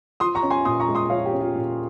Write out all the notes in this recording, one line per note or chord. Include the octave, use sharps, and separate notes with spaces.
F3 C6 D#6
A#5 C#6
C#4
G#5 C6
A#2 C6 D#6
A#5 C#6
G#3
C6 D#6
F3 C#5 F5
G4
C#4
F4
A#2